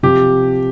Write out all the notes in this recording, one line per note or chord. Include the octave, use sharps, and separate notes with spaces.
C3 F3 G4